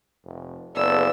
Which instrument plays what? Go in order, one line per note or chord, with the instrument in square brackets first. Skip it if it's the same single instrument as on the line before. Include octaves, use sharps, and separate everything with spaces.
[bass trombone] F1
[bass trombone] F#1 [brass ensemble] B3 G#4 A4 [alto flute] D5 [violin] E6